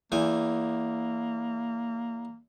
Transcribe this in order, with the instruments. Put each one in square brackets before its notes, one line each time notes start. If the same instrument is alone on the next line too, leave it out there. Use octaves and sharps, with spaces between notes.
[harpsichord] E2 E3 G#5 [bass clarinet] A#3